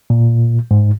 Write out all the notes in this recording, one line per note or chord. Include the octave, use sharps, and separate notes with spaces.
A#2
G#2